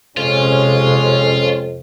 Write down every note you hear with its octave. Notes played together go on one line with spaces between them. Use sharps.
F2 C3 G#3 C#4 F4